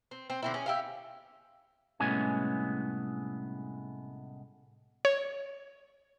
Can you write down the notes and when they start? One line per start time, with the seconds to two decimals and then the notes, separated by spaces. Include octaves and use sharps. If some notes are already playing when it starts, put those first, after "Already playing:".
0.11 C4
0.30 C4
0.42 D3 C4 E4
0.54 C#4 G#4
0.66 E4 G4 F5
2.00 C2 A2 G#3 B3 C#4 G#5
5.05 C#5